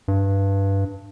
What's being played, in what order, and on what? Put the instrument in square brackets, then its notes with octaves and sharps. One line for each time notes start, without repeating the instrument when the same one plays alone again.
[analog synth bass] G2